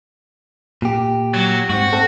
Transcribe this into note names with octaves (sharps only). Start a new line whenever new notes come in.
A#2 G4
F#3
G#2 C4 F#4
A3 C4 A4